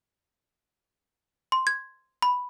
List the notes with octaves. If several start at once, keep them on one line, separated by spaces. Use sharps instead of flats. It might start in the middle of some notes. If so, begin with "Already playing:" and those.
C6
G#6
B5